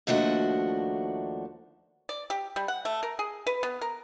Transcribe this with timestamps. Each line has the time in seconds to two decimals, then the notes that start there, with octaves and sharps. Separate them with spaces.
0.07 D#2 F3 A3 D4 F#4
2.09 D5
2.30 G4
2.56 G3
2.68 F#5
2.85 A3
3.03 A#4
3.19 G#4
3.47 B4
3.63 B3
3.81 A#4